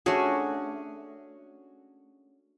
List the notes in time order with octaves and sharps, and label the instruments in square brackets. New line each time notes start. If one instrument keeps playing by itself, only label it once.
[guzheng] A3 D4 [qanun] C#4 F#4 G#4